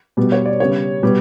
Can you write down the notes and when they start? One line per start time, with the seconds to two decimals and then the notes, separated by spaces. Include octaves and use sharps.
0.17 B2 G3 B3
0.32 C#5
0.46 D5
0.60 C#3 G3 B3 C#5
1.03 B2 G3 B3